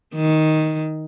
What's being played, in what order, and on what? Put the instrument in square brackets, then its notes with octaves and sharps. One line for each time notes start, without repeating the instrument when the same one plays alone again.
[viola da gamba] D#3